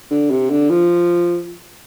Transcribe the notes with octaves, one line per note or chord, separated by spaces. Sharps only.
D3
C3
D3
F3